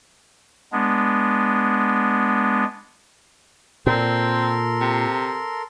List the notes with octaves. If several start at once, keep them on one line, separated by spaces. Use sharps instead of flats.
G#3 B3 D4
A#2 C4 A4 A#4 C6
C3